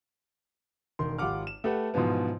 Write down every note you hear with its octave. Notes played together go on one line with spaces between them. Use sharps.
E1 D#3 C6
G#1 F4 G4 F#5 D6 F6
E7
A3 G4 A4 B4 F#5
G#2 B2 E3 F3 B3